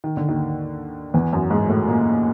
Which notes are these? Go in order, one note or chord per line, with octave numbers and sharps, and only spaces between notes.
D#3
D3
D#2 D#3
E2 E3
F#2 F#3
G#2 G#3
A2 A3
A#2 A#3